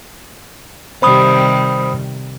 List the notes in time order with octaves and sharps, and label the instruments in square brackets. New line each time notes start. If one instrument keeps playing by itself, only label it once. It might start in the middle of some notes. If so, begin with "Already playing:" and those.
[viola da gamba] C3 D#3 G3 [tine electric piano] C5 B5 D#6